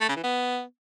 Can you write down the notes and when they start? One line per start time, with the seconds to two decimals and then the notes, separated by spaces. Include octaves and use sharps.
0.01 A3
0.09 C#3
0.16 E3
0.24 B3